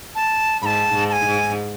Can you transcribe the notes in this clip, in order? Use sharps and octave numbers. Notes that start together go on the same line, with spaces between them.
A5
G#2 A5 B5
G#2
A5
G#5
G#2